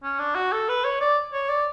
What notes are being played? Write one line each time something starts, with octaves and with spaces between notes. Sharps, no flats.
C#4
D4
F#4
A4
B4
C#5
D5
C#5
D5